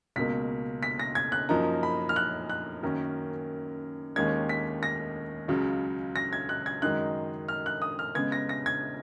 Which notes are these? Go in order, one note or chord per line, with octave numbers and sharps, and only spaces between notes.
C#2 B2 A#3 B6
B6
A#6
G#6
F#6
F#2 F3 A#3 D#4 A#5
B5
F6
F#6
F#6
F#2 D#3 A#3 C#4
D#2 D#3 G#3 C#4 G#6
B6
A#6
C#2 C#3 F#3
A#6
G#6
F#6
G#6
F#2 D#3 G#3 D#4 F#6
F6
F#6
D#6
F6
C#3 G#3 B3 G#6
A#6
A#6
G#6